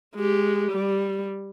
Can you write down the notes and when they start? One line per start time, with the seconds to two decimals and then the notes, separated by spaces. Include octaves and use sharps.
0.15 G#3 G4
0.72 G3